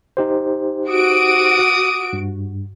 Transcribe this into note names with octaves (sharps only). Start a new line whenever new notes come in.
D#4 G4 C5
F#4 D6 D#6 D7
G2